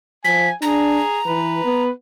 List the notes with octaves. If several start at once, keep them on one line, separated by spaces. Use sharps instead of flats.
F3 G#5 B6
D4 G#4 A#5
E3 B4
B3